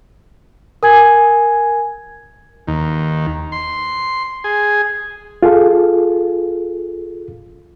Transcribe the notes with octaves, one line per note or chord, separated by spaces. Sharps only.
A#4 G#5 G#6
D#2
C6
G#4
F4 G#4 A4 F5